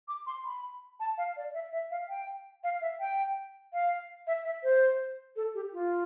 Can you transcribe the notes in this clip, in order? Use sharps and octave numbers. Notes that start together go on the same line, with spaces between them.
D6
C6
B5
A5
F5
D5
E5
E5
F5
G5
F5
E5
G5
F5
E5
E5
C5
A4
G4
F4